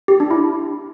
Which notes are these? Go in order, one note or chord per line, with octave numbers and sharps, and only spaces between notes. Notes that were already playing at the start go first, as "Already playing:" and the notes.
G4
D4
E4